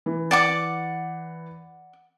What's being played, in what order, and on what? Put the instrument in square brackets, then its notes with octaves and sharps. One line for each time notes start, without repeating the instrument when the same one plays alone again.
[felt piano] E3
[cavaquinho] D5 F#5 D6